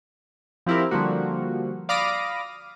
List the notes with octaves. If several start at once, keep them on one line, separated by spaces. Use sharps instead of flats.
F3 C4 E4 G4 A#4
D3 F3 G3 A#3 F#4
D5 F5 B5 D6 D#6 A#6